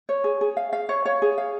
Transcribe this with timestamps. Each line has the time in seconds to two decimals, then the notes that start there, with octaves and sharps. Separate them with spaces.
0.09 C#5
0.24 G#4
0.41 G#4
0.57 F5
0.73 F5
0.89 C#5
1.05 C#5
1.22 G#4
1.38 F5